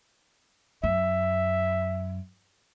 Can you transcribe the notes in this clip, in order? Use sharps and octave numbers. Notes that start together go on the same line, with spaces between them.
F#2 E5